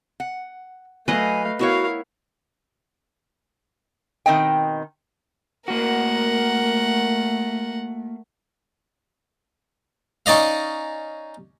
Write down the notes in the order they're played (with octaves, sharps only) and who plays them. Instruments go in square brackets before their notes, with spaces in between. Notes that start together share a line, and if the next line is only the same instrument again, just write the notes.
[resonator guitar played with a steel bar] F#5
[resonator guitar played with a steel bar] F#3 [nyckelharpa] A3 F5 [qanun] B4 D#5 [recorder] G#5
[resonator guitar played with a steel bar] B3 E4 C#5 [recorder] F#4 [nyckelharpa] A#4 F5
[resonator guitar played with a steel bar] B2 D#3 C4 D#5 G5
[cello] A3 [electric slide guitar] A#3 F#4 [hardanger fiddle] A#4 F#5
[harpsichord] C#4 D#4 D5 D#5 F5